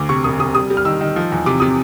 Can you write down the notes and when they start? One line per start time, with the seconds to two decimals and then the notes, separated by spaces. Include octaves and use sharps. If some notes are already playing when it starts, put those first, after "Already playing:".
Already playing: D2 D6
0.09 C3 C#6
0.24 E1 D#6
0.39 C3 D#6
0.55 G3 D#6
0.70 G3
0.77 F6
0.85 D#3 E6
1.01 D#3
1.16 F3
1.32 E2
1.46 C3 D6
1.60 C3 D#6